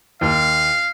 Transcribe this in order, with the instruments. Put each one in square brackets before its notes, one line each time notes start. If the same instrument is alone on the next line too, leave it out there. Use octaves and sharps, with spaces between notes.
[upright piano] D#2 [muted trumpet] F5